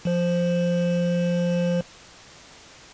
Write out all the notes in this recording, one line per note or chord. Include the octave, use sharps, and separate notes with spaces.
F3 C5